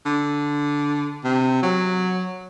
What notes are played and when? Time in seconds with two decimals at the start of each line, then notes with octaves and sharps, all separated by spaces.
0.06 D3
1.24 C3
1.63 F#3